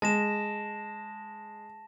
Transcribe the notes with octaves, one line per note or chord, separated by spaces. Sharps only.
G#3 A5 A#6 E7